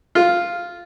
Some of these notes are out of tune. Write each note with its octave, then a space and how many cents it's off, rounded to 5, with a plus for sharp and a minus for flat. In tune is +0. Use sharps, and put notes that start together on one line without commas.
F4 -5